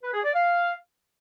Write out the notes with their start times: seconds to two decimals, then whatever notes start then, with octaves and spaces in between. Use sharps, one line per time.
0.03 B4
0.13 G#4
0.24 D5
0.34 F5